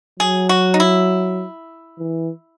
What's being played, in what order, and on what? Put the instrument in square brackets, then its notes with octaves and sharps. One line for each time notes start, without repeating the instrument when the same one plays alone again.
[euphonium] F#3 [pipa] G#4
[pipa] F#4
D#4
E4
[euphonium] E3